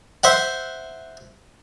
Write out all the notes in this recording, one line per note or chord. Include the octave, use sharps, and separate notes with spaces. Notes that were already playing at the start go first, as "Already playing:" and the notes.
C5 E5 F#5